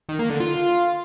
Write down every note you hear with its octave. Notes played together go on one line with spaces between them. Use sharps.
D#3
A#3
D3
F4